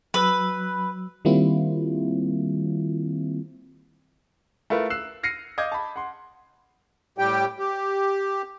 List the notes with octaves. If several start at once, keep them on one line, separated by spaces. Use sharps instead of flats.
F#3 B4 E6
D#3 G3 A#3 C4 E4 F4
A3 E4 F4 A#4 B4
E6 F#6 C7 E7
F6 A#6 C7 C#7 D#7
D#5 F5 D6 G6 G#6
A5 B5
F#5 C6
A2 G3 G4 G5
G4